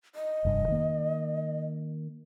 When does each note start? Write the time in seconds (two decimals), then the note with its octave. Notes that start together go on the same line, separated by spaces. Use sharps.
0.15 D#5
0.45 F1 G2
0.68 D#3 A#3